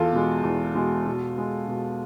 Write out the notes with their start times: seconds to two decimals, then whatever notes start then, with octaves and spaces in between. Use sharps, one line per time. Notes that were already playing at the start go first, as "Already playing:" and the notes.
Already playing: E2 F4 A4
0.13 B2 G#3
0.44 E2
0.75 B2 G#3
1.06 B2
1.38 G#3
1.68 B2